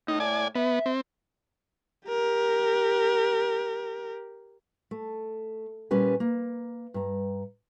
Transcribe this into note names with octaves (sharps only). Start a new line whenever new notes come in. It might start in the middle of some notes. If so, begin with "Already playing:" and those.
A2 D#4
D5 G#5
B3 E5
C4
G4 A#4
A3
A#2 G3 C#4 B4 G#5
A#3
G2 A#5